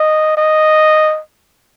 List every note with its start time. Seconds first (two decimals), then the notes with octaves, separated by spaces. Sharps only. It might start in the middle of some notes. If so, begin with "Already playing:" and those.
Already playing: D#5
0.37 D#5